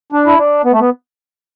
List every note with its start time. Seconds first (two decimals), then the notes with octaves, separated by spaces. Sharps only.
0.12 D4
0.27 E4
0.39 D4
0.65 B3
0.72 A3
0.80 B3